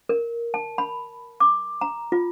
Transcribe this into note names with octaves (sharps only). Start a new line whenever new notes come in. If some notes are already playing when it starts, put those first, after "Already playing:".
A#4
A5
B5
D6
A#5
F4